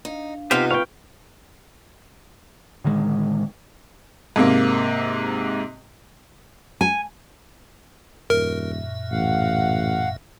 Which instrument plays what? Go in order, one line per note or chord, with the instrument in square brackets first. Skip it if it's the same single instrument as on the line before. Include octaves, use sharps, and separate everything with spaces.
[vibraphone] D4 F5 [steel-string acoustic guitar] D#4
[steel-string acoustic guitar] C3 B3 D#4 [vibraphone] C4 F4 [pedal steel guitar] G4 C5 F5
[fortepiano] B4 C#6 [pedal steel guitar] F5 G5
[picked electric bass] A2 D3 D#3 G#3
[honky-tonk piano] G#2 C3 A#3
[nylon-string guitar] G#5
[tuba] D#1 [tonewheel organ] F#2 A#2 E5 [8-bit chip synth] A#4
[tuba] A1 [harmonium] F5 F#5